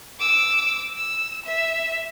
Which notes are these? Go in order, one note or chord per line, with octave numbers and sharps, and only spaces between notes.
D6 E6
E6
E5